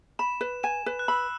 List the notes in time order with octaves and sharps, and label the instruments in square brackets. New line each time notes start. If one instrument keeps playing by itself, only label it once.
[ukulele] B5 [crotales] E7
[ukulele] B4
[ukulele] G#5 [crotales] E7
[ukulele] B4
[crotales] F#6
[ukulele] B5 [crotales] E6